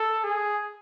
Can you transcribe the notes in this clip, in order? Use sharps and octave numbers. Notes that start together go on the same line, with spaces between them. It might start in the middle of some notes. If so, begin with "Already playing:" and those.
Already playing: A4
G#4